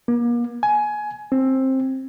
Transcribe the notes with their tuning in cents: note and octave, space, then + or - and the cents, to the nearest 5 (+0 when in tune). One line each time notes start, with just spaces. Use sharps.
A#3 +35
G#5 +20
C4 +15